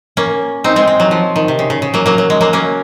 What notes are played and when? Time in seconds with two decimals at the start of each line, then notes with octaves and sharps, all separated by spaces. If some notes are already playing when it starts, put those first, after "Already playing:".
0.17 A#3 C#4
0.64 C4 D#4
0.76 G#3 C4
0.88 G#3
1.00 F#3
1.11 F3
1.36 D#3
1.48 C3
1.59 C#3
1.70 C#3
1.82 C#3
1.94 F#3 A#3
2.06 F#3 A#3
2.18 F#3
2.30 G#3
2.41 F#3 A#3
2.53 A#3 C#4